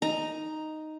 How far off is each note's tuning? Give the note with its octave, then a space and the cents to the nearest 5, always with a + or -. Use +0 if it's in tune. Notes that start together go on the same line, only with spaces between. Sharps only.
D#4 +0 A#5 +5